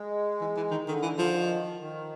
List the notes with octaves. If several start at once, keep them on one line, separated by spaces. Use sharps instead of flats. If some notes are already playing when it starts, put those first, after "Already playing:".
Already playing: G#3
E3
E3
D#3
D3 D#3
E3
F3
D#3
D#3